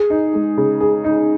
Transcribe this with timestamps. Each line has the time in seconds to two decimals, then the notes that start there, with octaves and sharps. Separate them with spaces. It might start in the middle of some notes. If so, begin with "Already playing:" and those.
Already playing: G#4
0.10 D#4
0.33 G#3
0.57 C#3
0.81 G#4
1.04 D#4